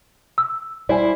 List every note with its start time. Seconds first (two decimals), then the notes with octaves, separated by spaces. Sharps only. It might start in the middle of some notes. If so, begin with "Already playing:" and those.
0.38 E6
0.89 G3 E4 C5 D5 G#5